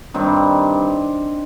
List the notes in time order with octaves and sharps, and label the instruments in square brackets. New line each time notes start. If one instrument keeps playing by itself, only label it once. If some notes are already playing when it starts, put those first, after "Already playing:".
[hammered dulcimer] G2 D#3 G3 C4